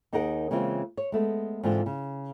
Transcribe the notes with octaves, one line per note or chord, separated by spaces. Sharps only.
D#2 D#4 G#4 A#4 F#5
C#3 E3 G#3 A#3 C4 F4
C#5
G#3 A3 B3
G#2 D3 E3 C4 F4
C#3